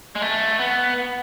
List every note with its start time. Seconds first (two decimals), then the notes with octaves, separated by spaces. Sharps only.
0.15 G#3
0.22 A3
0.59 B3